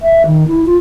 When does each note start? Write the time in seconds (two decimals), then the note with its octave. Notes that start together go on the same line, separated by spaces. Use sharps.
0.02 E5
0.26 D#3
0.48 E4
0.66 F4